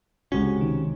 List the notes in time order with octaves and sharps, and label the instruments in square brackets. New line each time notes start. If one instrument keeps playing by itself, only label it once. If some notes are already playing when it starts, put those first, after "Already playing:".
[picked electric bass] C#2 C3 C#4 [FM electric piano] G#3 F#4
[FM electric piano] D#3